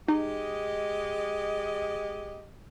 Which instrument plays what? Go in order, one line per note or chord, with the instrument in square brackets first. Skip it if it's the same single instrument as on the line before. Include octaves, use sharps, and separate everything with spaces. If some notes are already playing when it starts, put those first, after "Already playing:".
[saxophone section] G#3 G4 D#5 [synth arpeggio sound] D#4